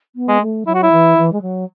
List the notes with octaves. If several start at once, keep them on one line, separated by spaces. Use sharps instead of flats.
B3
G#3
A3
F#3 E4
F#4
E4
E3
E3
G#3
F#3